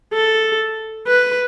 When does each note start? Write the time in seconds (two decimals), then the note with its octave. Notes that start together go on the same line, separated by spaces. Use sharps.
0.13 A4
1.07 B4